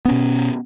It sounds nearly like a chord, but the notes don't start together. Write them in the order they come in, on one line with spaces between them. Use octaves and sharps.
B3 C#4 B2